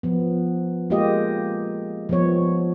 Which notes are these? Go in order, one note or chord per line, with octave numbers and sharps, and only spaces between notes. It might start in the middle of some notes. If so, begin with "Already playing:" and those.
F3 B3
G#3 A#3 F4 G4 D#5
F3 G3 B3 C#5